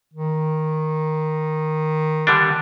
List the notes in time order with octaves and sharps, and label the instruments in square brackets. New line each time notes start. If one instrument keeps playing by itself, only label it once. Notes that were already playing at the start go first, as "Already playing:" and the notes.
[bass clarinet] D#3
[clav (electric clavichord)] D3 G3 D4